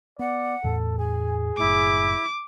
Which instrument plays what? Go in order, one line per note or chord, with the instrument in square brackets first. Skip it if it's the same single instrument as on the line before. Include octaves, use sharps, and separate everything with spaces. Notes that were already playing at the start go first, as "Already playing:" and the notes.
[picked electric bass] B3 [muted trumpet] D5 [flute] F#5
[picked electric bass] E2 A2 [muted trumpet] A4
[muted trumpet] G#4 [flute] G#5
[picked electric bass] F#1 A2 [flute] E4 [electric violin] D6